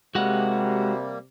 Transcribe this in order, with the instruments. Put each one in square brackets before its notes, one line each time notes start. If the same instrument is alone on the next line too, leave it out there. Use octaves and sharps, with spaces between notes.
[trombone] C3 [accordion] G3 A#3 [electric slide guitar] G#3 [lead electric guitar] F#4 F#5